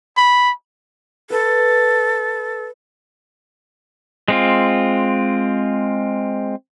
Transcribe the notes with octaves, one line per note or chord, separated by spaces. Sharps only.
B5
A4 B4
G#3 C4 F4